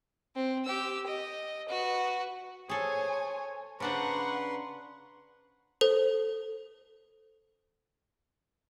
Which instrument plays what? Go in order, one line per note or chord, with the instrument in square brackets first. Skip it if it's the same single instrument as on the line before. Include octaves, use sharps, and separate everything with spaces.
[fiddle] C4
G4 E6
D#5
F#4 B4
[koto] G#4 A4 [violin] C5 G#5 [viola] C#5
[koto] C#3 D4 C5 [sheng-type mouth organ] B4 C6 [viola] F#5 A#5 [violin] C#6
[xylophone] A4 C5